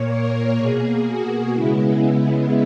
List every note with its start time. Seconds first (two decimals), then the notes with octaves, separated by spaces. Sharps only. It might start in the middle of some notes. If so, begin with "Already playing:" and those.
Already playing: A#2 A#3 C#5
0.10 A#4
0.56 B2 A#3 G#4
1.05 F#4
1.53 C#3 G#3 B3 E4